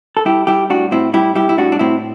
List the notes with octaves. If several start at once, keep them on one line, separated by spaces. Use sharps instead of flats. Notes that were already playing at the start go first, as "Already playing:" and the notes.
A4
G3 E4 G4
G3 E4 G4
A2 D4 F#4
A2 C4 E4
G3 E4 G4
G3 E4 G4
E4
A2 D4 F#4
D4
A2 C4 E4